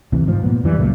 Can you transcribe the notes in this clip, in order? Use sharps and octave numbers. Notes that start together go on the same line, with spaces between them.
D2 C3 E3
G#2 F3
A#2 B3
F#2 E3 G3
C#2 F#2 A#2 A3